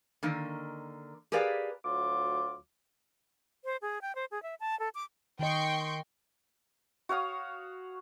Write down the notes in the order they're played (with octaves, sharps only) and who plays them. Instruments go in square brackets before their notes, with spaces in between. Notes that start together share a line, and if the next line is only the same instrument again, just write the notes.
[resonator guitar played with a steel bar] D3 D#3 A#3
G4 G#4 A#4 B4 D5 F5
[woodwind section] D2 F#3 F4 D6
[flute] C5
G#4
G5
C5
G#4
E5
A5
A4
D6
[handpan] D#3 D#5 [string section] G5 C6 C#6
[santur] F#4 C#5 F5 D#6